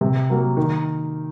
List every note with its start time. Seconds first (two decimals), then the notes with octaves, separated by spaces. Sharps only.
0.01 C3
0.30 F#3 A#3
0.57 D#3